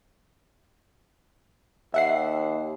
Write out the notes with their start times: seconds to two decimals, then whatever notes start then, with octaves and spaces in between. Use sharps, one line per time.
1.94 D#2 E5 F#5 C7